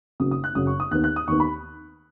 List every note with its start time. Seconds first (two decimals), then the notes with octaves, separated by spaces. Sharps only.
0.20 F#1 F#2 C#3 F#3 D#6
0.31 D#6
0.44 F#6
0.55 F#1 F#2 C#3 F#3 D#6
0.67 C#6
0.80 D#6
0.91 D#2 D#3 B3 F#6
1.04 F#6
1.16 D#6
1.28 D#2 D#3 B3 C#6
1.40 B5